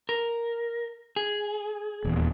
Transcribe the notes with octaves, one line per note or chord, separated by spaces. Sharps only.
A#4
G#4
D#1 E2